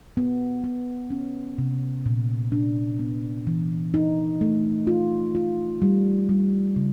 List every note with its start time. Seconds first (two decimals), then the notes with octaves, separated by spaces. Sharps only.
0.17 B3
0.64 B3
1.10 C#4
1.58 C3
2.06 A#2
2.52 D4
2.99 B3
3.47 E3
3.94 D#4
4.41 A3
4.87 F4
5.35 F4
5.82 G3
6.29 G3
6.76 C#3